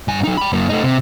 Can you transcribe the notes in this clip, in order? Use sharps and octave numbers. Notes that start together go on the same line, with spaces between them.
G2 G#5
F#3 D#4
G5 B5
F#2 A#3
A3 D#4
C3